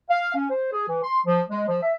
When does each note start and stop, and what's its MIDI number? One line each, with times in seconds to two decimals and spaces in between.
0.09 0.30 77
0.34 0.48 61
0.50 0.72 72
0.72 0.85 68
0.87 1.00 52
1.03 1.19 84
1.26 1.41 53
1.50 1.64 56
1.67 1.77 53
1.81 1.93 76